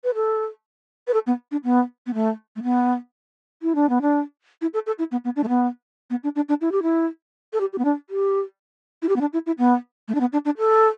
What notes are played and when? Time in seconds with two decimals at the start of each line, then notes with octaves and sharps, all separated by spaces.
0.04 B4
0.15 A4
1.08 B4
1.14 A4
1.27 B3
1.51 D4
1.64 B3
2.07 B3
2.14 A3
2.56 A3
2.63 B3
3.62 E4
3.75 D4
3.89 B3
4.02 D4
4.62 E4
4.74 A4
4.87 A4
4.99 E4
5.12 B3
5.25 B3
5.36 D4
5.44 A3
5.49 B3
6.10 B3
6.24 D4
6.36 D4
6.49 D4
6.61 E4
6.72 G4
6.83 E4
7.53 A4
7.61 G4
7.73 G4
7.78 B3
7.85 D4
8.10 G4
9.02 E4
9.09 G4
9.16 B3
9.21 D4
9.33 E4
9.46 E4
9.58 B3
10.08 A3
10.15 D4
10.20 B3
10.33 D4
10.45 D4
10.58 A4